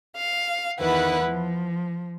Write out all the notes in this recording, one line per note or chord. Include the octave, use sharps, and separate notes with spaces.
F5
E2 D#3 E4 B4 F#5
F3